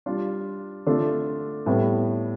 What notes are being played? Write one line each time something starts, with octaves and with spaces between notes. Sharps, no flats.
G3 D4 F4
D3 A3 D4 F4 A4
A2 G3 B3